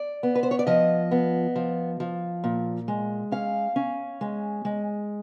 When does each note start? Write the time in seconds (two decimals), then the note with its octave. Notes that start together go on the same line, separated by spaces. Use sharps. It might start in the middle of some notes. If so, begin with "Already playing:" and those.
Already playing: D5
0.23 B3
0.35 B4
0.43 C5
0.51 C#5
0.59 D5
0.67 F3 D#5
1.11 B3
1.56 F3
2.00 F3
2.44 A#2
2.88 G#3
3.32 C#4 F5
3.76 C#4
4.21 G#3
4.65 G#3